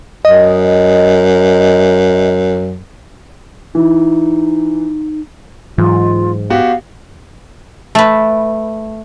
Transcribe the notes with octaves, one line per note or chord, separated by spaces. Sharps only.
F#2 D#5
E3 D#4
G#2 E3 F#3 F4
B3 F#4 G4 F5
A3 B4